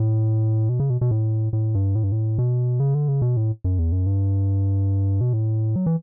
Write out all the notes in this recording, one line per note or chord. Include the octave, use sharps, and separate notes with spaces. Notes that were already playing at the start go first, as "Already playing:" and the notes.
Already playing: A2
B2
C#3
B2
B2
A2
A2
G2
A2
G2
A2
B2
C#3
D3
C#3
B2
A2
F#2
E2
F#2
G2
B2
A2
F#3
E3